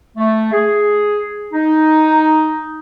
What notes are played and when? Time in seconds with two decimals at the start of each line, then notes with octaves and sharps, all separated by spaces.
0.17 A3
0.53 G#4
1.53 D#4